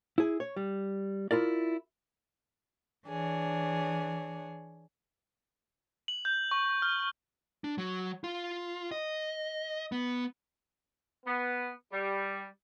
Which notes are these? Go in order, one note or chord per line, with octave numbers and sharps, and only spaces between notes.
E4 G#4
C#5
G3
E4 F4 A#4 D5
E3 D4 G#4 C#5
F#7
G6
C#6
F6
D4
F#3
F4
D#5
B3
B3
G3